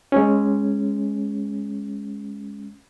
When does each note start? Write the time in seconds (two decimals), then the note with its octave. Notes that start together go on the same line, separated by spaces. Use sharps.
0.12 G#3 C#4